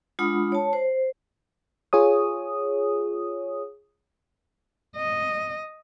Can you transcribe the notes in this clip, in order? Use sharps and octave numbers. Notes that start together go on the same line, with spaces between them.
G#3 D4 F4 F#5 B5 D#6
C#5 A5
C5
F4 G#4 C#5 D#6
D#5